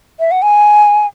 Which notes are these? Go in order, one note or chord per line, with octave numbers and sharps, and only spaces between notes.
E5
F#5
G#5